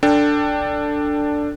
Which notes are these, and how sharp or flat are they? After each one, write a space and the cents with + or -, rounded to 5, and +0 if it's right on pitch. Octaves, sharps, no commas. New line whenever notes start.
D4 +0 A4 +20 G5 +0